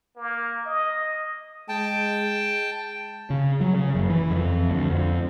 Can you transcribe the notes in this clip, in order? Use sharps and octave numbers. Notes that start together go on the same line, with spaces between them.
A#3
D#5
G#3 G5 A5
C#3
F#3
C#3
F#1
E3
F2
D2
F2